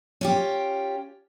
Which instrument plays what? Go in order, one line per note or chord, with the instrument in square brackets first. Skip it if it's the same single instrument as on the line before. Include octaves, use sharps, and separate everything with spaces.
[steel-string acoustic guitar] C#4 F4 G4